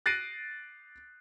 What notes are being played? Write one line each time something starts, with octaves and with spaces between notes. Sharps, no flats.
F#6 A6 A#6 C7 D7 D#7